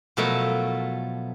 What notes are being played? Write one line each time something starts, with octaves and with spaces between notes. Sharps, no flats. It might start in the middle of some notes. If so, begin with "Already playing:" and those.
B2 F3 F#3 A3 A4 A#4